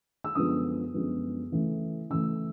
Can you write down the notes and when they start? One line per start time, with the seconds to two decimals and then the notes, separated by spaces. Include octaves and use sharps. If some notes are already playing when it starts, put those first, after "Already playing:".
0.24 E6
0.35 F#2 D3 F3 G#3 B3 D#6
0.94 F#2 D3 F3 G#3 B3
1.52 C#3 E3 A3
2.10 C#3 E3 A3 E6